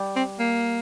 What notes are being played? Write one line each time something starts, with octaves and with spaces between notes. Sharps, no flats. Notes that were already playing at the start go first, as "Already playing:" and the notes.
Already playing: G3
C4
A#3